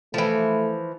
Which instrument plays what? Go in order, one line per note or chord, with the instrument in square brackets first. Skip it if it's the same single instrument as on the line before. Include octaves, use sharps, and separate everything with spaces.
[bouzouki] E3 F3 [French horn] A3